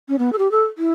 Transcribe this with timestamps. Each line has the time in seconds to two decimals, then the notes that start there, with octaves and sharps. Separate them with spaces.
0.09 C#4
0.19 B3
0.33 A4
0.38 G4
0.52 A4
0.78 E4